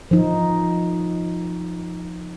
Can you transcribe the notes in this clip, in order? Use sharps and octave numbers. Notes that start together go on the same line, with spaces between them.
F3 D#4